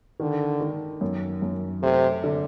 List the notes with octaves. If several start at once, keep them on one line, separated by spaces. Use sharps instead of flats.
D3 D#3
D#3
F#2
F#2
C3 A3
D3